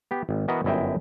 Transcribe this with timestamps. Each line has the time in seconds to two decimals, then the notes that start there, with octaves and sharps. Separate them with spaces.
0.11 B3 G4
0.29 G#1
0.48 E3 B3 F#4 A#4 D#5
0.64 G1 F#2 E4 D#5 E5 G5